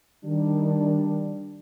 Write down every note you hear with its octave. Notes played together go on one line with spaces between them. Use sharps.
D#3 G3 D4